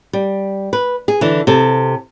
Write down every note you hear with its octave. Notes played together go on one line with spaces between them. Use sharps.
G3
B4
G#4
D3 E3
C3 A4